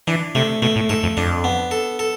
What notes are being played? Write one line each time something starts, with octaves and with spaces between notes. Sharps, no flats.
E3 D4
C3 A3
B2 A3
A2
G#2 A4
F2
F2 D4
B3
A4
A4